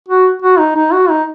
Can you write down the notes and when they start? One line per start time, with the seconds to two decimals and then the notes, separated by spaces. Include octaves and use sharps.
0.08 F#4
0.42 F#4
0.59 D#4
0.76 D#4
0.93 F#4
1.10 D#4